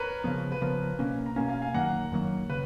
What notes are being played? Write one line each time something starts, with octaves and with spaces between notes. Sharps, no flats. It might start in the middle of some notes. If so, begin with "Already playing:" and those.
Already playing: A#4 B4 C#5
C#3 F3 B3
B4
C#3 F3 B3 A#4
B2 A#3 C#4
A#5
B2 A#3 C#4 F5 G#5
F5 G#5
F5 G#5
F#2 D#3 F#3 A#3 F#5 A#5
F#2 D#3 F#3 A#3
C#3 B4